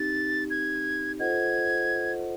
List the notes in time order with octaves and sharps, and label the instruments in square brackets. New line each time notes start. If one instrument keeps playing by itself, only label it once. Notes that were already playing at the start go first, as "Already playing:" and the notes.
Already playing: [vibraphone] C4 D#4 G4 [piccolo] A6
[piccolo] G#6
[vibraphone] F4 A4 C5 D#5 F#5 [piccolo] G#6